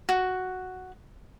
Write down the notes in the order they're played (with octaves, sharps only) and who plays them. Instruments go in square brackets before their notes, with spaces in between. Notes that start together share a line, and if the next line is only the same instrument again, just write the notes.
[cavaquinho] F#4